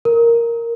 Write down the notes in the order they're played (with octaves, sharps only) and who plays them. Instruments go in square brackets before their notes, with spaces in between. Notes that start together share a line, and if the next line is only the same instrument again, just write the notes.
[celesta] A#4